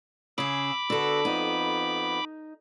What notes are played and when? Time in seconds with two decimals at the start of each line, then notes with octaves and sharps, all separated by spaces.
0.38 C#3 G#4 B5 D6 E6
0.90 D3 B3 F#4 A4 E6
1.25 F2 B3 D#4